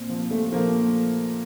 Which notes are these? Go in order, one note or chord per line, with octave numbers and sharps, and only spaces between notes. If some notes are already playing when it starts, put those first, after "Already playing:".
Already playing: A#2 C4
F3
A#2 A3
F3 A#3